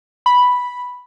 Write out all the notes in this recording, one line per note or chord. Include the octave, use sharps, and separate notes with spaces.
B5